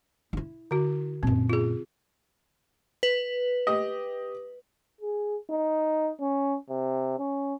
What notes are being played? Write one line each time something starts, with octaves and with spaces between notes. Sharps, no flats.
D#4 E4
D3 F#4
F#2 A#2 C4
F4 G#4
B4
G4 D#5
G#4
D#4
C#4
C3
C#4